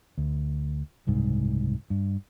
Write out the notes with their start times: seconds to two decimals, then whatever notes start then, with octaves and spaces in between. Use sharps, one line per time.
0.18 D2
1.07 F#1 C2 G#2
1.90 G2